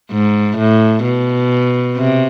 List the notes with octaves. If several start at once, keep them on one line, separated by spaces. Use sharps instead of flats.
G#2
A2
B2
C3